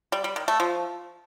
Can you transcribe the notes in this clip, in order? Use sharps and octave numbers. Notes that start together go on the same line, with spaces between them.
G3
G3
D#3
A3
F3